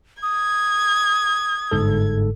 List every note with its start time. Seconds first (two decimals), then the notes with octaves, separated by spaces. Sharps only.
0.23 D#6 G#6
1.71 G1 G#2 A4